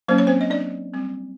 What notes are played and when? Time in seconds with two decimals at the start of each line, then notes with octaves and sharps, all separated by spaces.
0.08 F#3 A#3 C#4 C5
0.18 C#5
0.27 C4 C5
0.41 D#5
0.50 D4 D5
0.93 G3 C4